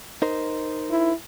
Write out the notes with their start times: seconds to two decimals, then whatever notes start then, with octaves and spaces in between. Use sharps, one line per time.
0.22 D#4 A#4 C5
0.91 E4